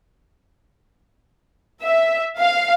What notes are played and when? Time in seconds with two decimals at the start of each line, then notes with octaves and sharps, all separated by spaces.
1.85 E5
2.39 F5